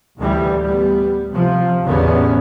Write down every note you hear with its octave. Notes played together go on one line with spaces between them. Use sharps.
A1 D2 D3 E3 G3
G3 B3
C3 F3
A1 E2 D3 B3 C#4